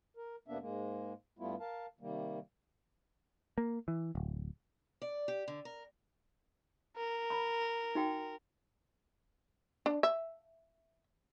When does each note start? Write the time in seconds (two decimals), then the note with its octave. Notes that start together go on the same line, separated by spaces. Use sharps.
0.17 A#4
0.48 F2 C3 A#3 B3 D4 E5
0.61 G#2 G#3 A#3
1.39 G2 G3 A3 B3 E4 F4
1.60 A#4 F5 A5
2.00 C3 D#3 G3 A#3
3.58 A#3
3.88 E3
4.15 D1
5.02 D5
5.28 G4
5.48 D3
5.65 A#4
6.97 A#4
7.30 A#5 B5
7.95 D#4 F#4 G5
9.86 D4
10.03 E5